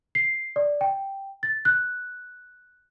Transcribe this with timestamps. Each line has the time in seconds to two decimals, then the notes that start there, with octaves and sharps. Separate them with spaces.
0.15 C7
0.56 D5
0.81 G5
1.43 A6
1.65 F#6